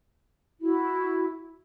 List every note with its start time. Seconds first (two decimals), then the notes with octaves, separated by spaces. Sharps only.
0.61 E4 F#4